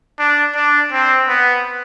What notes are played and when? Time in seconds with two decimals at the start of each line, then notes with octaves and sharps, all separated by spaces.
0.19 D4
0.55 D4
0.92 C4
1.28 B3